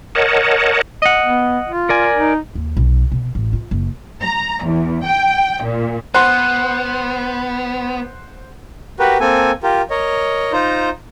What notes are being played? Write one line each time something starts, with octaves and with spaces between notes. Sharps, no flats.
A#4 C#5 D#5 F#5 A5
D#5 F#5
B3
F4
A#4 D5 G#5
D#4
D#2
B1
B2
A1
F4
F#1
A#5
E2
G5
A#2
B3 C5 F#5 C6 F#6
F#4 G4 A#4 B4
A#3 C4 A4 G#5
F4 G4 A#4
A#4 C#5 D#5
D#4 F4 C5 A#5